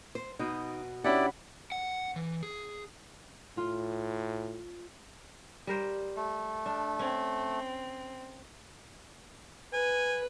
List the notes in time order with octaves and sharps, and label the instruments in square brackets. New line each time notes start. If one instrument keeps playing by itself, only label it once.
[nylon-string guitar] C5
[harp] B2 [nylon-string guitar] D#4
[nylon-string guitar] C#4 D4 G4 [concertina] E4 D5 [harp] F#5 B5
[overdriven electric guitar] F#5
E3
G#4
[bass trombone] A2 [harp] F4
[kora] G3 A#4 C5
[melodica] A3
[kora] D4
[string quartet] C4 [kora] C#4
[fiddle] B4 [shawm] G#5